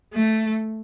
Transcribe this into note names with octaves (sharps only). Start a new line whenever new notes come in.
A3